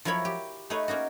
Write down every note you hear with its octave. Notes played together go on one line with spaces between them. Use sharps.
F3 F#3 E4 A#4 C#5 B5
G4
A3 D#4 G#4 B4 C#5
A#3 C#4 D#4 F#4